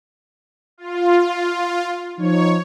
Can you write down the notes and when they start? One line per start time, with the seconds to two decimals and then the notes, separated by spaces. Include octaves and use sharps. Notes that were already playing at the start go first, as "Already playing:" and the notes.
0.78 F4
2.18 F3 D#4 C#5